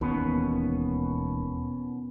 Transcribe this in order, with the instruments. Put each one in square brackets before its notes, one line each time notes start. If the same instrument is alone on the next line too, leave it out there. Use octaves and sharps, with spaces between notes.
[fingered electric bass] E1 D#2 D#3 [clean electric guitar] B2 B3 C#4